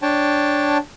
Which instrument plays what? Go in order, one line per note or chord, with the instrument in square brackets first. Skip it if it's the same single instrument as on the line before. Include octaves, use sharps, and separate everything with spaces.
[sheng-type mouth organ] D4 C#5 G5 A5